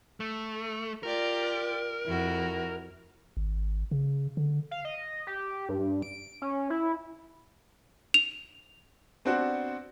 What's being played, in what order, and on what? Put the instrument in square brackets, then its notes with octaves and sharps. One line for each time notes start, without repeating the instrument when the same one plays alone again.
[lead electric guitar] A3
[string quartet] F4 G4 D5 [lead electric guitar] A#4
[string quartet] F2 E4 F#4
[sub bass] G#1
C#3
D3
[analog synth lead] F5
D#5
G4
G2
D7
C#4
E4
[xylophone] F7
[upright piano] B3 C4 D4 F#4 C5 F#5